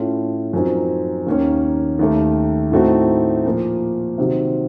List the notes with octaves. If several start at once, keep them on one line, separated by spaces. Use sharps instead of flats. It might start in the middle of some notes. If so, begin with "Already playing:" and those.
Already playing: A2 A3 C#4 F4
F#2 F3 C4 D#4
D#2 D#3 A#3 C#4
D#2 D#3 A3
A2 A3 C4 D#4 F#4
A#2 F3 A#3
C3 D#3 F#3 C4